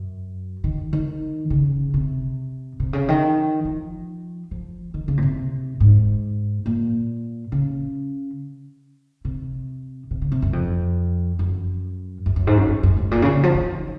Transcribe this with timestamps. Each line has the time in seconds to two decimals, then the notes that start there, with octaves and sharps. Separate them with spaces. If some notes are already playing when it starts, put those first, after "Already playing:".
Already playing: F#2
0.64 D#3
0.93 D#3
1.50 C#3
1.94 C3
2.80 C3
2.93 C#3
3.08 D#3
3.65 F3
4.51 F3
4.94 D#3
5.08 C#3
5.17 A#2
5.23 C3
5.80 G#2
6.66 A#2
7.52 C#3
9.25 C3
10.11 C3
10.22 C#3
10.32 C3
10.42 F#2
10.53 F2
11.39 F#2
12.26 F#2
12.36 F#2
12.47 G#2
12.57 F#2
12.68 F#2
12.83 F#2
12.97 G#2
13.11 A#2
13.22 C#3
13.33 C#3
13.43 F3
13.55 D#3